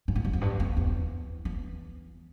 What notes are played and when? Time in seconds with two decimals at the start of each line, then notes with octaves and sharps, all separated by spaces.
0.08 G#2
0.16 A2
0.25 G2
0.33 F2
0.41 G2
0.60 F2
0.77 E2
1.45 E2